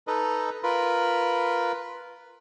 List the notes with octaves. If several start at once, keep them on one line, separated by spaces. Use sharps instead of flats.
D#4 A4 B4 D#5
F4 A#4 B4 B5